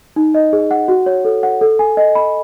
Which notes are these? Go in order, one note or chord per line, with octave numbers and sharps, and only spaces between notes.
D#4
D#5
G#4
F#5
F#4
C#5
A4
F#5
A4
G#5
D#5
B5